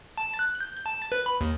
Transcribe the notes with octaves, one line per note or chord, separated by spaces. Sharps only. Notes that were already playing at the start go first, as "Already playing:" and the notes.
A5
F#6
G6
A5
B4
B5
D#2